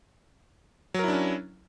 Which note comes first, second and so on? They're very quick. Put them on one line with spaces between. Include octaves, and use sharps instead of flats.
F#3 A#4 E4 D4 C#4